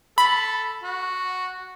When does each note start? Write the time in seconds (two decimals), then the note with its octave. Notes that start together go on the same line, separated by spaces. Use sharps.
0.18 A4 B5
0.84 F#4